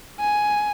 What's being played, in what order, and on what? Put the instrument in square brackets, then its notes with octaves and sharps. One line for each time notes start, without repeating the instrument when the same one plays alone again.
[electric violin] G#5